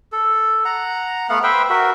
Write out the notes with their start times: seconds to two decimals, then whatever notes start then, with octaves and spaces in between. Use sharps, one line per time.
0.12 A4
0.65 F#5 A#5
1.30 A3 B3 F5 F#5
1.43 B4 C5 E5 G5
1.70 F#4 A#4 E5